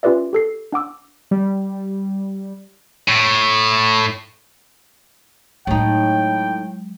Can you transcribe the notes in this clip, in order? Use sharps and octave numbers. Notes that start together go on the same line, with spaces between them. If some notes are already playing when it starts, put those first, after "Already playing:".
C#4 F4 G4 B4 D5 E5
G4 A4 C7
D4 F#5 D6 E6
G3
A2
A2 F#3 G#3 D#4 G5